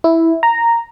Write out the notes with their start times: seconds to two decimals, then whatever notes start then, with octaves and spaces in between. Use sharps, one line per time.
0.04 E4
0.43 A#5